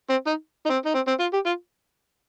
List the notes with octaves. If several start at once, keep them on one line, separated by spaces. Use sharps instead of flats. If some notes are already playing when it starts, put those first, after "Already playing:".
C4
D#4
D#4
C4
D#4
C4
C4
F4
G4
F4